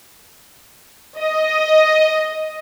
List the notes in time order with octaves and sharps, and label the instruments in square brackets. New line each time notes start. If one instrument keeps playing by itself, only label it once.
[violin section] D#5